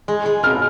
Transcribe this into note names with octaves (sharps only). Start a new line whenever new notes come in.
G#3
G#3
B2 F6